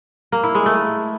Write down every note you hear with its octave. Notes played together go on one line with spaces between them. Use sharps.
A#3
E4
G#3
A3